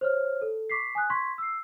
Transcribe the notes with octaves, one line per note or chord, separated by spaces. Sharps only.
C5 C#5 F6
A4
C#6 D6 B6 C7
G#5 D#6 F#6
C6 C#6 G#6 B6
E6 C7